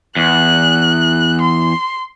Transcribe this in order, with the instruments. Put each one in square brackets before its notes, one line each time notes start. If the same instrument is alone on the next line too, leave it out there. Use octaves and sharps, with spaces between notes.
[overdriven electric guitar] E2 [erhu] F#6
[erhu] C6